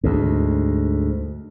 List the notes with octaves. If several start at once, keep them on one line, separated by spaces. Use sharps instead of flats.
D2 G#2